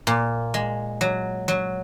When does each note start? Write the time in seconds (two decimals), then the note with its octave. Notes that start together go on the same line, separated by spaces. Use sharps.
0.07 A#2
0.54 G#3
1.01 F#3
1.48 F#3